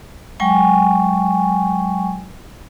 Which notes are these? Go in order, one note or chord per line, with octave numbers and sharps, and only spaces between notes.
F#3 G#3 G5 G#5 C#6